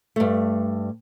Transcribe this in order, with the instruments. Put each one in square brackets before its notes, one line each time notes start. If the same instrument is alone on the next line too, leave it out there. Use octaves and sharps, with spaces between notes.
[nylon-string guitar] G2 A3